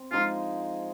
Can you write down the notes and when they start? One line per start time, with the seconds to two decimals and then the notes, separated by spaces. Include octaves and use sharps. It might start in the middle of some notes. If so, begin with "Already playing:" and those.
Already playing: C4
0.11 F3 G#3 D#4 F4 G#4